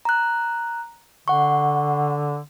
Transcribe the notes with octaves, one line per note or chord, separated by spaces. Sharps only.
A#5 F#6
D3 F#5 C#6